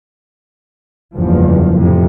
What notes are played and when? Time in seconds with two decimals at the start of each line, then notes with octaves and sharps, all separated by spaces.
1.15 F#1 E2 G2 F3
1.78 F2 A2 C3